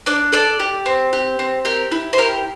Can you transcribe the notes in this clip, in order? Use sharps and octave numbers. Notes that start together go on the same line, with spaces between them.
D4 D5
A4 D5
G4
C4
G4
C4
G4 A#4
E4
C5
G4 A#4